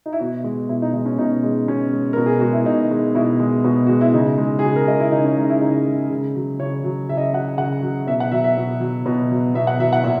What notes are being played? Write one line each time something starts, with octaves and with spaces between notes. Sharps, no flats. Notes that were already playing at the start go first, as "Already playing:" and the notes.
D#4
E4
B2 F#4
G#3
B2 E4
D#4
G#3 D#4
C#4
B2 D#4
G#3
B2 C#4
G#3
B2 A#4
G#4
G#3 F#4
E4
B2 D#4
G#3
B2 E4
G#3
B2
G#3 F#4
E4
C#3 D#4
G#3
G#4
C#3 F#4
A#4
G#3 D#5
E4
C#3 D#4
C#4
G#3 D#4
E4
C#3 D#4
G#3
C#3
F#3
C#3 C#5
F#3
C#3 E5
D#5
E5
F#3 F#5
C#3 F#5
F#3
B2 E5
F#5
F#3 E5
E5
B2
F#3
B2
F#3
B2 E5
F#5
F#3 E5
F#5
A#2 E5